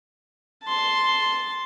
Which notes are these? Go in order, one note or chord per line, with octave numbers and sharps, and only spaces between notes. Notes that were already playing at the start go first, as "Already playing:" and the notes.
A5 C6